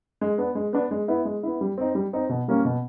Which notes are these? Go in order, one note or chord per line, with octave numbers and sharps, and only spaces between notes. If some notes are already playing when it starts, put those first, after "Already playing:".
G#3
B3 D4
G#3
B3 D4
G#3
B3 E4
G#3
B3 E4
G3
C4 D#4
G3
C4 D#4
B2
G3 A#3 C#4
B2